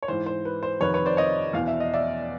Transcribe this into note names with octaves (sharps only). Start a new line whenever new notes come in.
C#5
G#2 E3 C5
C5
B4
C5
F2 C3 D#3 B4 C#5
B4 C#5
C5 D5
C#5 D#5
E2 B2 F5
E5
D#5
D5 E5